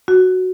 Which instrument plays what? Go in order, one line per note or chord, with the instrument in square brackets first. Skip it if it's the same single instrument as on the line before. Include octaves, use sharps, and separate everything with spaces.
[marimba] F#4